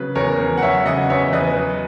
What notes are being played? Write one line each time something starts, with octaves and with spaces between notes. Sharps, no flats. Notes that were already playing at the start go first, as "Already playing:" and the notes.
Already playing: C#3 F#3 B4
E2 A#4 C#5
E2
F#5
F#3 C#5 E5
C#3 D#5 F#5
E2 C#5 E5
E2 B4 D#5
F#3